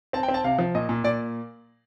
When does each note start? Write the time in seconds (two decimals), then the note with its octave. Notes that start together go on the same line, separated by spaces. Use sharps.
0.13 C4 A5
0.23 G5
0.28 C4
0.34 A5
0.44 C3 F5
0.58 F3
0.75 A#2 D#5
0.89 A#2
1.04 A#2 D5